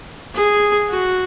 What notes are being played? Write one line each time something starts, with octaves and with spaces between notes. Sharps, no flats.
G#4
F#4